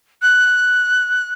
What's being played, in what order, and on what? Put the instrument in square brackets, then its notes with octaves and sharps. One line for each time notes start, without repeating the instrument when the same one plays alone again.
[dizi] F#6